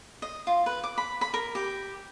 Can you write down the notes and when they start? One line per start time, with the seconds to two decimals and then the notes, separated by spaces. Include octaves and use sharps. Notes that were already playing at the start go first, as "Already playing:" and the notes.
0.22 D#5
0.47 F4
0.66 B4
0.84 D6
0.98 B5
1.21 B5
1.34 A#4
1.55 G4